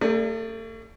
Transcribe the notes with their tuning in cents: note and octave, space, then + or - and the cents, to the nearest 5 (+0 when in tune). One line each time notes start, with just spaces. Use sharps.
A3 +40 G#4 -20 D5 +0